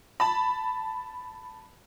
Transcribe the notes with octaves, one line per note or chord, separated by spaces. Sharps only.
A5 B5